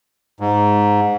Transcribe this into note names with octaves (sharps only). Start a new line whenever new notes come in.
G#2